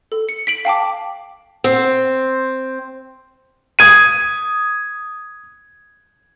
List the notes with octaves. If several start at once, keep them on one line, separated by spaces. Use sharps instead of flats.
A4
C#7
B6 D7 F#7
F5 G5 A5 D6
C4
D#6 G#6 D#7